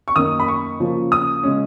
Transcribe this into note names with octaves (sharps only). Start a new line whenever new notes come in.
C#6
F#2 D#3 A#3 C#4 D#6
B5
C#6
C#3 F3 A#3 C#4
D#6
C#3 G#3 C#4